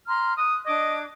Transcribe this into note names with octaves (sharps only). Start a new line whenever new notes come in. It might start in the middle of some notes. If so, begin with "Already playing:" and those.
A#5 C6 F6
D#6 F#6
D4 D#5 D6 G#6